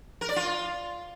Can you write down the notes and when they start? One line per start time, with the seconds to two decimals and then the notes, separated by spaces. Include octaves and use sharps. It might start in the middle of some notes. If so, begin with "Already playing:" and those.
0.21 A#4
0.29 D5
0.36 F4